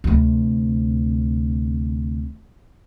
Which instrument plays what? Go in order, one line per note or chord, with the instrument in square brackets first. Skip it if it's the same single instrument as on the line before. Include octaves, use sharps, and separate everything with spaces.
[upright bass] D2 C3